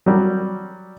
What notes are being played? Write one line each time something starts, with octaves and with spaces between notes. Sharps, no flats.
F#3 G3